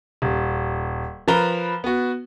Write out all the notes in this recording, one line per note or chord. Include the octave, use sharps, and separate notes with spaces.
D#1
F3 A#4 B4 A#5 B5 G7
B3 F#4